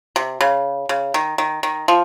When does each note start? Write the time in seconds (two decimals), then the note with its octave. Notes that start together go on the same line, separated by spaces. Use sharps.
0.16 C3
0.41 C#3
0.89 C#3
1.14 D#3
1.38 D#3
1.63 D#3
1.88 F3